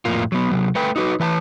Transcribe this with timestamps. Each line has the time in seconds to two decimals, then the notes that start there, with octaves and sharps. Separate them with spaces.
0.05 F2 A2 A#3 F4
0.32 F#3 B3
0.51 C3 F#3
0.75 A3 B4 G5
0.96 D#4 F#4 B4
1.20 E3 B4 G#5 A5